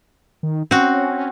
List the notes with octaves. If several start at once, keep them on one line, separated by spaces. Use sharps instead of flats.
D#3
C4 C#4 F#4